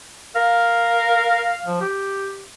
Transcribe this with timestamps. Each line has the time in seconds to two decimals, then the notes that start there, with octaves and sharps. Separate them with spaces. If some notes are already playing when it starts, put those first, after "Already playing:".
0.36 A#4 F5
1.66 F3
1.81 G4